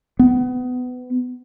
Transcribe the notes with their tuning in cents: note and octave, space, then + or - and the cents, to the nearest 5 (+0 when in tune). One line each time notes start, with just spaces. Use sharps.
B3 +25